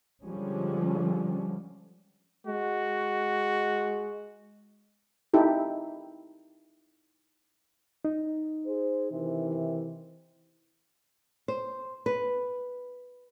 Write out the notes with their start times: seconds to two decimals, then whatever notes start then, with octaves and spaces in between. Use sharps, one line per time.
0.24 D3 F3 G3 G#3 C#4
2.47 G#3 F#4
5.34 D#4 E4 G4 A4
8.05 D#4
8.66 G#4 C5
9.11 C3 D#3 E3
11.48 C5
12.06 B4